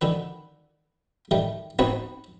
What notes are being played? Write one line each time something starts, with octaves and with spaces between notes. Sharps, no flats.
D3 D#3 B4
D#3 G3 A3
B3 C4 D#4 F#4 B4 C#5